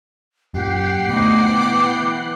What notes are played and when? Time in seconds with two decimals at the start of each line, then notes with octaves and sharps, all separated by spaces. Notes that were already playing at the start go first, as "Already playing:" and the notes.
0.54 F#2 A#2 G4 F#5 G5 C7
1.09 D2 B2 D#4 C5 D6
1.44 E3 B3
1.90 F#6